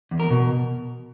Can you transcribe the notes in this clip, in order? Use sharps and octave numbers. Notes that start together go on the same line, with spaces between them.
E2
A#4
B2